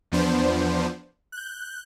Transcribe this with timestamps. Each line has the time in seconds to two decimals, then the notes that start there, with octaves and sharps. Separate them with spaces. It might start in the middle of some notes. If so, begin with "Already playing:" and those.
0.12 E2 F3 B3 D4 C5
1.32 F#6 G6